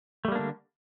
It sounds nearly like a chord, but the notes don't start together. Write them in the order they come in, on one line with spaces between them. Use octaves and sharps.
A3 G3 A#3 D4 D3